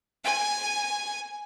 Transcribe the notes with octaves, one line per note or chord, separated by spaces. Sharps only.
G#5